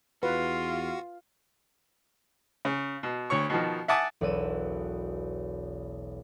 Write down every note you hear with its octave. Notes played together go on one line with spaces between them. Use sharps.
E2 F4 F#4 B4
C#3
B2
D2 C#5 C#6
B2 D#3 F3
E5 F#5 G#5 A5 D6 D#6
E1 B1 B4 E6 D#7 E7